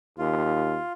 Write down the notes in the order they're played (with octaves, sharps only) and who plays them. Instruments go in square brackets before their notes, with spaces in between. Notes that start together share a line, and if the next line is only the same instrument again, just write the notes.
[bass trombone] D#2 [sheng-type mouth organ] F4